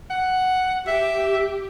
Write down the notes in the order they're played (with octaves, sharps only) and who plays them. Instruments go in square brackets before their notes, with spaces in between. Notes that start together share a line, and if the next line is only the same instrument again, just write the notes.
[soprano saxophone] F#5
[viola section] G4 [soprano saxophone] E5